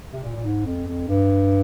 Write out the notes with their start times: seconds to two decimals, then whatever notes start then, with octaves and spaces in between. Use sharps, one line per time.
0.12 C3
0.23 A#2
0.35 A#2
0.44 G#2
0.65 F2
0.87 F2
1.08 G2